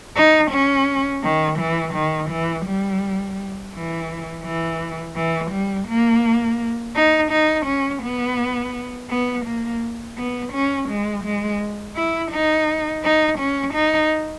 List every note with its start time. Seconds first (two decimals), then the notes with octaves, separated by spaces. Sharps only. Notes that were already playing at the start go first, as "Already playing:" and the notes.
0.16 D#4
0.51 C#4
1.23 D#3
1.59 E3
1.95 D#3
2.30 E3
2.65 G3
3.74 E3
4.45 E3
5.16 E3
5.52 G3
5.88 A#3
6.95 D#4
7.32 D#4
7.66 C#4
8.03 B3
9.10 B3
9.46 A#3
10.18 B3
10.53 C#4
10.89 G#3
11.24 G#3
11.96 E4
12.32 D#4
13.04 D#4
13.39 C#4
13.74 D#4